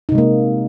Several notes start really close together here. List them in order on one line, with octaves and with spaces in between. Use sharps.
D#4 C3 G#3 A#3